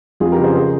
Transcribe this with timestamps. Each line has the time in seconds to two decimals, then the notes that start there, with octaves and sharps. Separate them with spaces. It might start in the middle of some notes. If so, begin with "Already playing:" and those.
0.20 F2 F4 G#4
0.32 G4 A#4
0.38 C#3
0.44 G#4 C5
0.55 G#4 C5